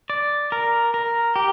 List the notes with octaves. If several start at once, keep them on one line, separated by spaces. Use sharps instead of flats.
D5
A#4
A#4
G4